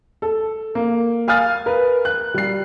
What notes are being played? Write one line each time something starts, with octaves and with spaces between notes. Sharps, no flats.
A4
A#3
F5 G#5 D#6 F6 A6
A#4 B4
F#6
G3 C7